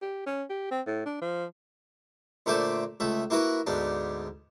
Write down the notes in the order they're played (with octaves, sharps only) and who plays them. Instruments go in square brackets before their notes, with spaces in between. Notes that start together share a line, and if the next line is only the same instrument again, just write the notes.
[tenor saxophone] G4
C#4
G4
C4
A2
D4
F3
[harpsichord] A#2 D3 A3 C5 E5 D6
C#2 A3 E5
A#3 E4 F#4 A#4 B4
D2 G#2 B3 D4